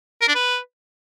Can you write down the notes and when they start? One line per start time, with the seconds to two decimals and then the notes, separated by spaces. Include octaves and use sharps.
0.21 A#4
0.28 D4
0.35 B4